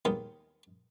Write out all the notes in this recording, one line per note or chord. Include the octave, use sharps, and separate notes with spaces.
D#2 D#3 B3 F4 G#4